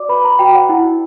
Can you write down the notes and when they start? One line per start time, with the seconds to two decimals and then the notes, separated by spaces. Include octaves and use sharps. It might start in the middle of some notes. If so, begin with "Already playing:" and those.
Already playing: F#4 D5 D6
0.09 B4 B5
0.24 A#5
0.39 F#4 G5
0.55 F#5
0.69 E4